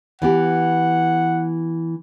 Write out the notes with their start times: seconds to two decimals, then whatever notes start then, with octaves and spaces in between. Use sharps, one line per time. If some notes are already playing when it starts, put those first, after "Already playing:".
0.22 E3 B3 G4 F#5